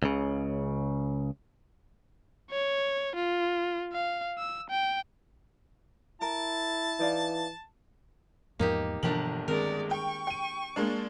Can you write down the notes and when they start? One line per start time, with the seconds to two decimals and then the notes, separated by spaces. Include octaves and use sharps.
0.03 C#2 C#3
2.51 C#5
3.16 F4
3.93 F5
4.38 E6
4.70 G5
6.22 E4 A#4 A5
6.99 E3 D#4 D5 F5
8.59 E2 G#2 F3 A#3 D#4 G4
9.03 G1 B2 E3 F3 D4 G4 A#4 F#7
9.48 D#3 G#3 C4 A#4 D5
9.91 G5 C#6
10.27 G5 D#7
10.76 G#3 A#3 D4